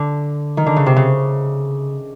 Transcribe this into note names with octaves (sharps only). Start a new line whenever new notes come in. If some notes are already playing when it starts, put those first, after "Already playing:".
Already playing: D3
D#3
D3
C#3
C3
C#3